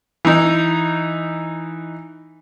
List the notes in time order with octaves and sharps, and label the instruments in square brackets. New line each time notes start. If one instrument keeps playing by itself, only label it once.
[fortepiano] E3 D#4